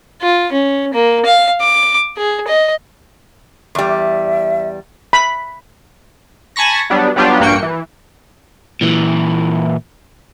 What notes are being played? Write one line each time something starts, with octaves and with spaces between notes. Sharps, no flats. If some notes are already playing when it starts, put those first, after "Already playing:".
F4
C#4
A#3
F5
D6
G#4
D#5
E2 G3
E5
B5
G#5 A5 B5 C#6 A#6
F#3 G3 B3 D4
F#3 G3 B3 D4 F4 G4
A#1 G2 A#3 F#4 G5 C#7
E3
A#2 E3